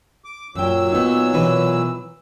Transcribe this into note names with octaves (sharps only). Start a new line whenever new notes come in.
D6
F#2 A#2 F#3 G5 E6
B3 D#4
B2 E3 B4